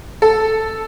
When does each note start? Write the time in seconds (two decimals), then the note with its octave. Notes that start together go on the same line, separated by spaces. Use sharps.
0.22 A4